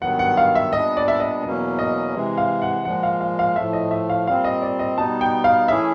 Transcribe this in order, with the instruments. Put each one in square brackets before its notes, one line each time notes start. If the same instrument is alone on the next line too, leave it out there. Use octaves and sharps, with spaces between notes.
[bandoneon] G2 D#3 F#3 B3 [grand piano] F#5
[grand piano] F#5
F5
E5
[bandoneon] A#2 G3 B3 D4 [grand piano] D#5
[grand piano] D5
E5
D#5
[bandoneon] E2 B2 F#3 A#3 C#4
[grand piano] D#5
[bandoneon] C3 E3 G#3
[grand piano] F5
F#5
[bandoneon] A#2 F3 G#3 [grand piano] F#5
[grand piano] F5
F5
F5
[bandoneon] A2 F3 A3 [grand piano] E5
[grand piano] D#5
E5
F5
[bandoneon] A#2 G3 C4 [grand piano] F5
[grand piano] D#5
D5
D#5
[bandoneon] B2 G3 B3 D#4 [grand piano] A5
[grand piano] G5
F5
[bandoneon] E3 A3 C#4 E4 G#4 [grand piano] E5